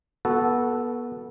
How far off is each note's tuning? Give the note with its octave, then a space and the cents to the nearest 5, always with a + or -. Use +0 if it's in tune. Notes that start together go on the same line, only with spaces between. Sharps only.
B3 -30 F#4 +0 A4 -10